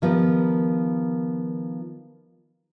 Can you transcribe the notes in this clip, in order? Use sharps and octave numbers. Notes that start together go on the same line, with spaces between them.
D#3 F3 B3 G4 A#4